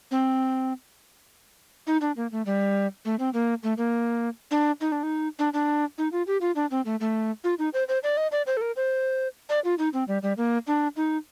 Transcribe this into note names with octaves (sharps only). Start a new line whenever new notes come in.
C4
D#4
D4
A#3
A3
G3
A3
C4
A#3
A3
A#3
D4
D#4
D4
D#4
D4
D4
D#4
F4
G4
F4
D4
C4
A3
A3
F4
D#4
C5
C5
D5
D#5
D5
C5
A4
A#4
C5
D5
F4
D#4
C4
G3
G3
A#3
D4
D#4